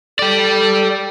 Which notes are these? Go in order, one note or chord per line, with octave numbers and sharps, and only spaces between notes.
G4 A4 D5